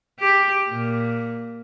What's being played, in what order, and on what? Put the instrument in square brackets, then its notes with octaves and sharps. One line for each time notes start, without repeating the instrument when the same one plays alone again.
[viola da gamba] G4
A#2